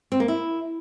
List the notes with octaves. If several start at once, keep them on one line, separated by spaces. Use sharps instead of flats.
C4
A#3
E4